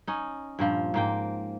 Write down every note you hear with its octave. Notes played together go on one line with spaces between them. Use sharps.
C#4 D#4
G2 A#2 F3
G#2 A#3 G5